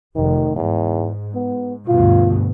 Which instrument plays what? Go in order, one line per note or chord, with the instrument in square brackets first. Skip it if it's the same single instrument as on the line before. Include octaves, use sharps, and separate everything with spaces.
[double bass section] F1 [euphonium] D#3
[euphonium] E2 [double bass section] G#2
[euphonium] B3
[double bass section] D2 G2 B2 [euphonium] F4